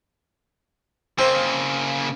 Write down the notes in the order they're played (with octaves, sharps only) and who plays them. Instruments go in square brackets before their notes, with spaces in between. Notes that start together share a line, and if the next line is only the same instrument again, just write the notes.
[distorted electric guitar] C#3 A#3 [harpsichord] C4